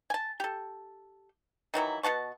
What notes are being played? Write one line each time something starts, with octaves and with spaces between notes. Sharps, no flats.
G#5 A5
G4 A4
D#3 E3 F#3 E4
B2 F#5 A5 C#6